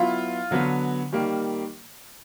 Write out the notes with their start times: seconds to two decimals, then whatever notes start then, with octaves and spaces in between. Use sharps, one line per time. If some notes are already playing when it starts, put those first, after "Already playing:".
Already playing: F#3 B3 E4 F4
0.51 D3 F#3 B3
1.12 D#3 G3 A#3